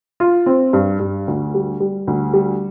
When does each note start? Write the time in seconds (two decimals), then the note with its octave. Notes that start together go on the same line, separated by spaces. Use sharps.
0.20 F4
0.46 C4
0.73 G2
1.00 G2
1.28 D2
1.54 G3
1.80 G3
2.07 D2
2.33 G3